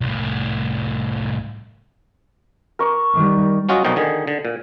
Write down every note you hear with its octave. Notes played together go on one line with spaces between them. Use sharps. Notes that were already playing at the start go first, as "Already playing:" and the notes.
C2 A2
A#4 C#6 D6
D#3 G3
F#3 C#4 F4 F#4 D#5
B1 F2 A#2 F3 D#5 G5
D3 D#3 G#4
D3
A#2